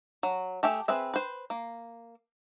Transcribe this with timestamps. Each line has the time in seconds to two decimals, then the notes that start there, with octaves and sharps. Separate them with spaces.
0.23 F#3
0.63 A3 G4 G#4 E5
0.88 C4 G#4 B4 E5
1.14 B4 C5
1.50 A#3